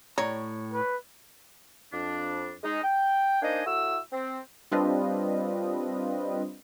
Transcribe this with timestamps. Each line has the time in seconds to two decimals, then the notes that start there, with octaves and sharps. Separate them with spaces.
0.18 A2 C#5 A#5
0.74 B4
1.93 F2 D4
2.64 G#3 D#4
2.84 G5
3.42 A#3 D4 D#4 C5 D#5 G#5
3.66 A2 E4 F#4 E6
4.12 C4
4.72 G3 C4 D4 F4 B4 D#5